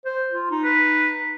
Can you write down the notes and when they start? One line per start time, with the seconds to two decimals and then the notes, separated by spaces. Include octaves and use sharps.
0.05 C5
0.32 F4
0.51 D#4
0.64 B4